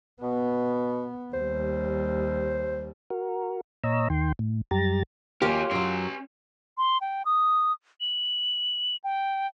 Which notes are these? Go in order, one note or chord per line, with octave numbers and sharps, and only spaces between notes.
B2 B3
D#2 G3 C5
F#4 A#4
A#2 C#5 D#5 A#5 E6
D#2 D#3 G5 C6
A2
F#2 G3 G4 A#5 A6
D#2 F4 G4 A#4 C#5 G#5
F#2 F#3 C#4 C6
C6
G5
D#6
F#7
G5